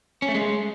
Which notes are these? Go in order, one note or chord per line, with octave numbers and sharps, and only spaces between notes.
C#4
A3
G#3